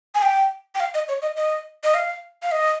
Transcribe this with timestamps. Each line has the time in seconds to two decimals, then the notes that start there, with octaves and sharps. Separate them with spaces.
0.15 G#5
0.22 G5
0.75 G5
0.80 F5
0.94 D#5
1.09 C#5
1.22 D#5
1.36 D#5
1.84 D#5
1.94 F5
2.43 F5
2.51 D#5